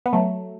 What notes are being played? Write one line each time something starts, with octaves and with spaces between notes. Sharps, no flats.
B3
F#3 A3